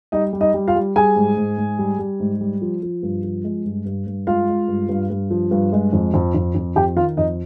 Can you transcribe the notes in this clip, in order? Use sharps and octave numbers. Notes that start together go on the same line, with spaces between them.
G3 D#4 D#5
G3
D#4 D#5
G3
F4 F5
G3
G3 G#4 G#5
G#2
G#2
G#2
G3
G3
G#2
G3
F3
F3
G2
F3
G#3
G2
G2
G2
G#3 F4 F5
G#3
G2
G2
G2
F3
G2
G#3
F2
F2
F2
F2
F2 G4 G5
D#3 F4 F5
F2 D#4 D#5